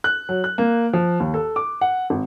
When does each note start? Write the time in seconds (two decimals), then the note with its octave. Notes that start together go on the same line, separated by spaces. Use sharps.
0.04 F#6
0.29 F#3
0.44 F#6
0.58 A#3
0.93 F3
1.20 D#2
1.34 A4
1.56 D6
1.81 F#5
2.10 G#1